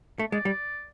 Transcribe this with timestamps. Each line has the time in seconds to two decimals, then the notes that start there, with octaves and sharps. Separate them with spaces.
0.19 A3
0.32 G#3 D5
0.45 G3